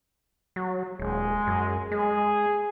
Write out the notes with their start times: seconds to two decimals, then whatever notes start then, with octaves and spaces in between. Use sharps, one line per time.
0.56 F#3
1.00 D#1 G#3
1.47 F#2
1.92 G#3 G#4